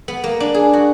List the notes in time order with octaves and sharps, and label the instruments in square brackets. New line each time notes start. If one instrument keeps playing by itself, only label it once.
[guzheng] B3
A#3
D4
G#4
F#4